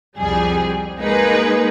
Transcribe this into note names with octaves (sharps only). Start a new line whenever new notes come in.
C2 F2 G3 G#4
G#3 A#3 D#4 G#4 B4